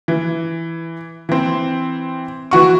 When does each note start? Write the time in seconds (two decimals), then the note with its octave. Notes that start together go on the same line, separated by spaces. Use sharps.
0.08 E3
1.29 E3 C4
2.51 E3 F#4 C#6